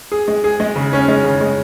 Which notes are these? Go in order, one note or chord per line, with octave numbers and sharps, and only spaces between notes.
G#4
G#3
G#4
G#3
C#3
C#4
G#3
C#3
G#3